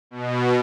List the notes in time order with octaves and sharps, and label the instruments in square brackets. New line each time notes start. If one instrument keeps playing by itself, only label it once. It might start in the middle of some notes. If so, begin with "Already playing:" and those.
[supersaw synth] B2